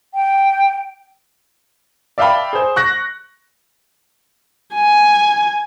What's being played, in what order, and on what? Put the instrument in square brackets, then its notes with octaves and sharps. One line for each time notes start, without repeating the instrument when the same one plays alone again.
[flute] G5
[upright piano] D5 E5 F5 G5 A5 B5
G#4 C5
C#6 F#6 A#6
[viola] G#5